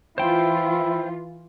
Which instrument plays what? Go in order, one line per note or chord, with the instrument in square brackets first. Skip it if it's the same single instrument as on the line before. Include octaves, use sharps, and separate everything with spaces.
[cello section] E3 F4 [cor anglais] E4 [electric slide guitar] C5 G5